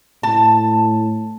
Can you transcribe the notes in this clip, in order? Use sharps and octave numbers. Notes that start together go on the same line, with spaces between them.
A2 A5